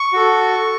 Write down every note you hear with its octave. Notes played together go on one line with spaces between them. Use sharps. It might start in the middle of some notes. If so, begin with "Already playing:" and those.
Already playing: C#6
F#4 A4